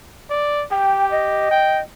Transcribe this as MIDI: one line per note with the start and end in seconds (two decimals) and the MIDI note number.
0.30 0.64 74
0.71 1.49 67
0.71 1.09 79
1.11 1.81 75
1.51 1.80 79